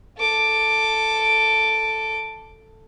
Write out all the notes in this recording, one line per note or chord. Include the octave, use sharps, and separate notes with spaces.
A4 D6